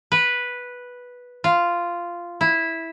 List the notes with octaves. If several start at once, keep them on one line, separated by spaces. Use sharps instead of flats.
B4
F4
E4